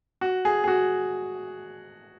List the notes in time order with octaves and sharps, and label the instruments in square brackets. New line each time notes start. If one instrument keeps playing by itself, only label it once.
[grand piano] F#4
G#4
G#4
F#4